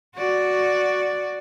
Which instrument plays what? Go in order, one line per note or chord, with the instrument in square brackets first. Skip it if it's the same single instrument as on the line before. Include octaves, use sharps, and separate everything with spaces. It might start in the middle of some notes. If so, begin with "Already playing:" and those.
[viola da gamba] F#4 D5